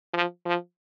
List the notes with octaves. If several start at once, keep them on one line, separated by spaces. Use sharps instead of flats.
F3
F3